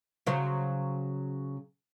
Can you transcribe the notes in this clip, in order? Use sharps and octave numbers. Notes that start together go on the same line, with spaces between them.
C#3 F#3 C5